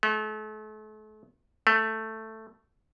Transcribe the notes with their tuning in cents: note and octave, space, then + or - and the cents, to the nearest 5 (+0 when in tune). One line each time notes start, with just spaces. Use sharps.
A3 -40
A3 +5